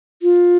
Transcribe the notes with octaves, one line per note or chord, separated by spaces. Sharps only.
F4